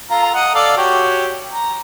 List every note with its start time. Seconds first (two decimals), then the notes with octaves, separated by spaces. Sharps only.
0.11 F4 A4 A#5
0.35 D#5 F#5
0.55 A4 D5 F5
0.77 F#4 G4 C#5
1.51 A#5